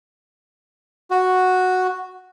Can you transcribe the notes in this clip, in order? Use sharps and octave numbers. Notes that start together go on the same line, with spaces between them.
F#4